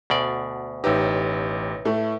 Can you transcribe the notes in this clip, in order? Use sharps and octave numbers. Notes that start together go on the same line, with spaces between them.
D2 B2 D5
A1 D#4 G4 B4 C#5 E5 E6
A2 A3